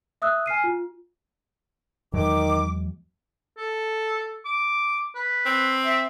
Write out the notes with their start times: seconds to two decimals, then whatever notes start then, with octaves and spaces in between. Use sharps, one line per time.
0.22 E5 D#6 E6 F#6
0.46 G#5 F6 C7 D#7
0.64 F4
2.13 E2 D#3 F#3 G#3 D6
3.58 A4
4.45 D6
5.15 B4
5.45 C4
5.85 E5